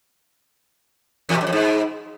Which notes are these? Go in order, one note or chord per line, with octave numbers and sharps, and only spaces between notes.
E2
B2
F#2
F2
G#2